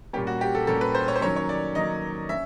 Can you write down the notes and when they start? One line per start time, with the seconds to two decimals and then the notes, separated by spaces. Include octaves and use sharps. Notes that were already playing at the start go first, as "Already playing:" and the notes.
0.13 A#2 G3 A#3 C#4 G4
0.27 F#4
0.41 G4
0.55 A4
0.67 A#2 G3 A#3 C#4 A4
0.81 B4
0.95 C5
1.08 C#5
1.16 C5
1.21 D#3 F#3 A#3 C#4 C#5
1.36 C#5
1.49 D5
1.75 D#3 F#3 A#3 C#4 D#5
2.29 C#4 E5